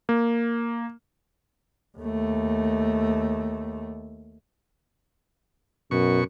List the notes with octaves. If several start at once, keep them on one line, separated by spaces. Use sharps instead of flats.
A#3
D#2 A3
F#2 B2 C#6